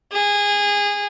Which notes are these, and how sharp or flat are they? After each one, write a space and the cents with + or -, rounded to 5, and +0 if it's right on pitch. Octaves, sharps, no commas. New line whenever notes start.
G#4 -20